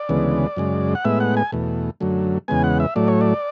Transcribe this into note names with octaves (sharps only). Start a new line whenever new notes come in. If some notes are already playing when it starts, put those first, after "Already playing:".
Already playing: D5
D2 C#3 E3 G#3 B3
F#2 C#3 G#3
F#5
A2 G#3 B3 E5
F#5
G#5
E2 B2 A3
F#2 D3 F#3 A3
E2 C#3 G#3 B3 G#5
F#5
E5
A2 F#3 A3 D5
C#5
D5